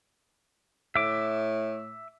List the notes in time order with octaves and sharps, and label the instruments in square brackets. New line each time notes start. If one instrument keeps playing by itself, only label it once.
[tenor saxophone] A2 [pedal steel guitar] E5 D6